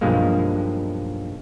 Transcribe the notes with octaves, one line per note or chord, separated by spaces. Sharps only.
B1 G2 F3 G#3 A#3